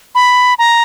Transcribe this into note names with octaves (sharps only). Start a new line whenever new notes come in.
B5
A#5